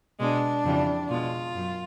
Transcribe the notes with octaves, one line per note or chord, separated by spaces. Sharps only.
B2 G#3 D4
F2 C#3 E3 G3
B2 G#3 F4
F#2